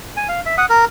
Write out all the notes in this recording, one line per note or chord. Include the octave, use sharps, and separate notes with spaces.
G#5
F5
E5
F#5 D#6
A#4